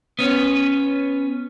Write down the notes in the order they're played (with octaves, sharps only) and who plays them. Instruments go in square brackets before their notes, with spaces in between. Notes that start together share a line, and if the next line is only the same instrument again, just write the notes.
[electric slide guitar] B3 C#4